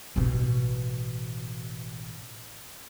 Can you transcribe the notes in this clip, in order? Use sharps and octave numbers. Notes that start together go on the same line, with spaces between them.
A1 B2